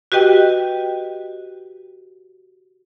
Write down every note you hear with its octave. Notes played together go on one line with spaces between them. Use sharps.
F#4 G4 B4 D#5 G5